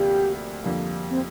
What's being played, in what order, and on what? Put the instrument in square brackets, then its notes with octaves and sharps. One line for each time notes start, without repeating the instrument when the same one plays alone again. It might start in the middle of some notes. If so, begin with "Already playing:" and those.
Already playing: [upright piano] D2 C3 F3 A#3 [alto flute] G4
[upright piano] F2 D3 G3 A#3
[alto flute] C4